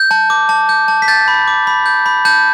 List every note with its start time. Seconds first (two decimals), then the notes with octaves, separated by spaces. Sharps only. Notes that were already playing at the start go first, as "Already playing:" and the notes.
Already playing: G6
0.11 A5
0.30 D6
0.49 A5
0.69 G6
0.88 A5
1.02 B6
1.08 G6 A6
1.28 B5
1.47 D6
1.67 B5
1.86 G6
2.06 B5
2.25 A5 G6